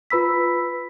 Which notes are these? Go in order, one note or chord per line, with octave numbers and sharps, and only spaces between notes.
F4 B4 B5 E6 B6